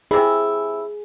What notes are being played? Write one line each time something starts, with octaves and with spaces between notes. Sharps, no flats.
C3 E4 G#4